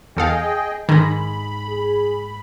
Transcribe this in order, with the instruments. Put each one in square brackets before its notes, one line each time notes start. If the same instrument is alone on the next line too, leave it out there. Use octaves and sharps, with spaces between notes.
[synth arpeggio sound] E2 A4 F5 [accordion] G#4 D#5 G5
[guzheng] G#2 D#4 [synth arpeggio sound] D#3 [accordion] B5
[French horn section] G#4